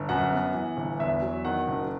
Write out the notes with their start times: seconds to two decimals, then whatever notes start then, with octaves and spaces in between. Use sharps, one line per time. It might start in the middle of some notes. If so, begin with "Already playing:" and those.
Already playing: G1
0.09 F#2 F#5
0.32 B3
0.54 E3
0.77 G1
1.00 E2 E5
1.22 F#3
1.45 D#3 F#5
1.68 F#1